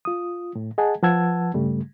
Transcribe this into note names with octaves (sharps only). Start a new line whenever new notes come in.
F4 D#6
A2
G#4 D#5 F#5 G#5 A5
F3 B4 F#5 A5 E6 G#6
G2 C#3 G3 A3